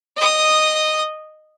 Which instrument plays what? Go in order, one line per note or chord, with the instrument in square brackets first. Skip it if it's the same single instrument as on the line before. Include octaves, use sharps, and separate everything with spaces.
[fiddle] D#5 D#6